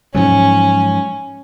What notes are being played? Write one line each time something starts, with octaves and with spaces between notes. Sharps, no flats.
G#2 F3 F#3 C#4